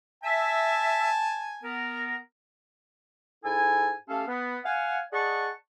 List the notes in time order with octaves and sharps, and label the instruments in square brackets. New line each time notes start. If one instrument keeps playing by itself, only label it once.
[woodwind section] E5 [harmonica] G#5 A5
[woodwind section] B3 A#4
G#2 E4 A4 G#5
A3 C#4 G4 A4 F5
B3
F5 F#5 G#5
G#4 D5 D#5 F#5 A5 C#6